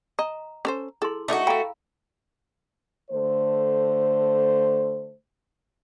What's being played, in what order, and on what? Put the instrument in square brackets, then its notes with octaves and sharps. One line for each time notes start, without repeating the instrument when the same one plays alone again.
[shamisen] D#5 [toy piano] A#5
[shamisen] C#4 A4 C5
[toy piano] E4 G#4 C6 [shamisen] A4
[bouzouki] A3 F#4 [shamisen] D4 D#4 D#5
[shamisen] A4 G5 [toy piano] F5 A#5 B5
[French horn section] D3 A3 C5